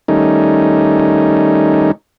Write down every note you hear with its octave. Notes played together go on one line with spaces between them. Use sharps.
D#3 G3 A3 C#4 D#4